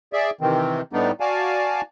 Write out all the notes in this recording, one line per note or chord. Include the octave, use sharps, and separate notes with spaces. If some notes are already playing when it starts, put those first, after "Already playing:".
G#4 D5 E5
C3 D#3 E3 C4
A2 G3 A3 B3 D4 D#4
F#4 D5 F5 G#5 A5